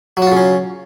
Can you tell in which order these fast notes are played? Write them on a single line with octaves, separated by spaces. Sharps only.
F#3 F#4 F4 C#3 C#4